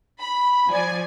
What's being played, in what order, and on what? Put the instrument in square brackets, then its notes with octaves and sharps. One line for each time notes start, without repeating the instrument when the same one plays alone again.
[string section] B5
F3 D5 G#5